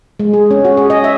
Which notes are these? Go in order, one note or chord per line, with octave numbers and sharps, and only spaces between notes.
G#3
G#4
C#4
F#4
G#4
D#5
E5